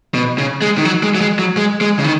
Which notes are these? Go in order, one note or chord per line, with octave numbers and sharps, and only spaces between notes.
B2
C#3
G#3
D#3
F#3
G#3
F#3
G#3
F#3
G#3
G#3
C#3
D#3